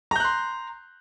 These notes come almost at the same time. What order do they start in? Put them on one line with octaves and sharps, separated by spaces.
A#5 G6 F#6 C6